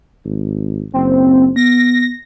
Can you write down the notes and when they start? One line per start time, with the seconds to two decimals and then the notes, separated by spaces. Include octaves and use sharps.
0.25 G#1
0.93 F#1 C4
1.56 B3 A#6